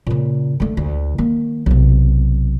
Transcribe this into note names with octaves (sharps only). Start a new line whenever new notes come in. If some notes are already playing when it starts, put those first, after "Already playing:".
A#2 C#3
D3 A3
D2
D#3 A#3
B1 C3